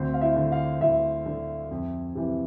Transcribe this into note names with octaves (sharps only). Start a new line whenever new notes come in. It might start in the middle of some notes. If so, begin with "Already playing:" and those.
Already playing: D2 C4 C5
F5
E4 E5
D3
F4 F5
D2 E4 E5
D3
F2
C3 E3